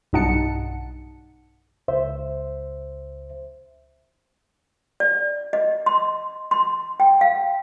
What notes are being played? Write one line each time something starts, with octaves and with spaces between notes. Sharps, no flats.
B1 G2 D#4 F#5 A5 C#7
C#2 C5 E5
D5
D#5
C6
C6
G5
F5